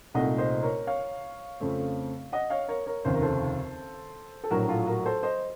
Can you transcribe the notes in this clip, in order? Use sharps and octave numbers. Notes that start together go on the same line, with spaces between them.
C2 A#2 A3 D#4 D#5 F#5
C5 D#5
A#4 C#5
C#5 F5
F2 C#3 A3 C4
D#5 F#5
C#5 F5
A#4 C#5
A#4 C#5
F1 D#2 C#3 C5
A#4
A4 C5
A4
A#1 A2 F#3 F#4 A#4
F4 A4
F#4 A#4
A4 C5
C5 D#5